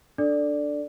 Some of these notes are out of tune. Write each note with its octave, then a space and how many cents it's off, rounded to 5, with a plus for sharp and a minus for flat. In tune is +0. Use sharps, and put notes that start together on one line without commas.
D4 +0 A4 +0 D5 +0